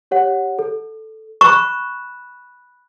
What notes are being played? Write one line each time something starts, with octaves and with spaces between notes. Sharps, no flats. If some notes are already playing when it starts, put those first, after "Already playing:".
G4 C#5 F#5
A4
B5 C#6 F#6 E7